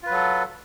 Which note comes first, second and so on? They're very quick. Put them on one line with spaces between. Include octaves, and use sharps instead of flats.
F4 B4 F#3 A4